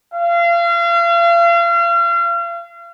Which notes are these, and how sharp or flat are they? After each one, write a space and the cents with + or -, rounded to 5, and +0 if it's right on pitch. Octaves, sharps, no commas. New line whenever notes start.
F5 -35